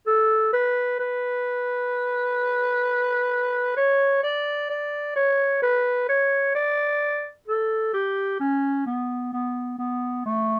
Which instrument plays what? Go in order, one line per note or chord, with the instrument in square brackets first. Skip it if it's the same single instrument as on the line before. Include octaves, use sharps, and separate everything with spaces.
[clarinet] A4
B4
B4
C#5
D5
D5
C#5
B4
C#5
D5
A4
G4
C#4
B3
B3
B3
A3